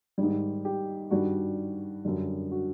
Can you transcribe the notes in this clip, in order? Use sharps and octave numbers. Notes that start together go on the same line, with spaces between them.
G#2 D#3 G3
G4
G2 D#3 G3 F#4
F#2 D3 G3
F#4